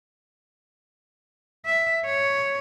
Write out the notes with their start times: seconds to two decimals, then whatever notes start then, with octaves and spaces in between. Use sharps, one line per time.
1.66 E5
2.06 C#5